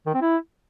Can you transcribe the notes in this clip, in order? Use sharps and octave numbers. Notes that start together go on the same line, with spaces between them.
D#3
C4
E4